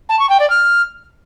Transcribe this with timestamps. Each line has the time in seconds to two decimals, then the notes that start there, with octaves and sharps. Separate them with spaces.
0.09 A5
0.19 C#6
0.29 G5
0.40 D5
0.50 F6